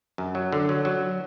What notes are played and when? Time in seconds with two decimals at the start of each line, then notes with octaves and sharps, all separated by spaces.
0.18 F#2
0.35 F#3
0.52 D3
0.69 F#3
0.85 F#3